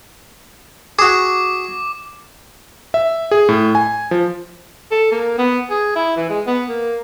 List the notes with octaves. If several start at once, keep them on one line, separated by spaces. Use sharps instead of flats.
F#4 G#4 D6
E5
G#4
A2
G#5
F3
A4
A#3
B3
G#4
E4
E3
G#3
B3
A#3